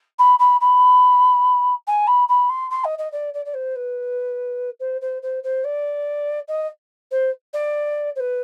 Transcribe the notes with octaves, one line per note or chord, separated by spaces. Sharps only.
B5
B5
B5
G#5
B5
B5
C6
C6
D#5
D#5
D5
D5
D5
C5
B4
C5
C5
C5
C5
D5
D#5
C5
D5
C5
B4